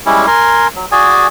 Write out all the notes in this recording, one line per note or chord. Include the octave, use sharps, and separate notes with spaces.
G3 G#3 C#4 E4
A#4 G#5 C6
F#3
F#4 G#4 D5 G#5